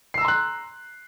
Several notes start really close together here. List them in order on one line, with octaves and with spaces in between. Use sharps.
C7 E6 A#5 C6 F#6